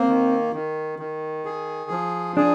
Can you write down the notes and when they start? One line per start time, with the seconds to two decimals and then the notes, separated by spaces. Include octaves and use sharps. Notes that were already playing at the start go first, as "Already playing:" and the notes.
Already playing: A#3 C4
0.08 D#3
0.53 D#3
0.99 D#3
1.45 G#4
1.90 F3
2.37 D4 G#4